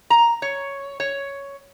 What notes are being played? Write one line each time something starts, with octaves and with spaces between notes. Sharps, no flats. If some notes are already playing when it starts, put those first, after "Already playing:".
A#5
C#5
C#5